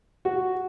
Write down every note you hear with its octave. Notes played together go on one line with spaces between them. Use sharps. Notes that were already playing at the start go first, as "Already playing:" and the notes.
F#4